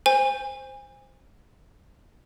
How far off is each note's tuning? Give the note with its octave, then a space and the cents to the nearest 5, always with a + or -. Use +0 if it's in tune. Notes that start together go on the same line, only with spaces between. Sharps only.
C5 +0 G#5 -30